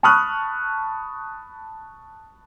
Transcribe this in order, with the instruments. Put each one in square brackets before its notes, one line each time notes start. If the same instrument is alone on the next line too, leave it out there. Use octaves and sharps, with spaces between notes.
[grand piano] A5 B5 C#6 D#6 F6 F#6